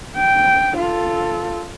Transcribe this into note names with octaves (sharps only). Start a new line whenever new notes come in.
G5
F4 A4